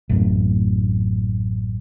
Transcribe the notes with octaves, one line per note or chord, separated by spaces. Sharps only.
A1 F#2